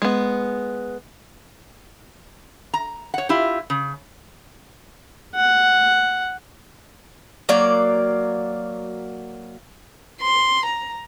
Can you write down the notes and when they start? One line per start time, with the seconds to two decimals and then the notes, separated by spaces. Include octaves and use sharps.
0.02 G#3 B3
2.73 A#5
3.14 C#5 F#5
3.29 E4 F4 G4
3.70 C#3
5.35 F#5
7.49 F#3 A#3 D5
10.21 C6
10.65 A#5